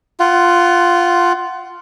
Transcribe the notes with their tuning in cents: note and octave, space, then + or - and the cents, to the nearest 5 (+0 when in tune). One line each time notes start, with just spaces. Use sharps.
F4 +0 F#5 +20